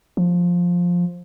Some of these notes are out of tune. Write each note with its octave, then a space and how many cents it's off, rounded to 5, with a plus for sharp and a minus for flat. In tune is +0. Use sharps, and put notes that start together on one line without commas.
F3 +10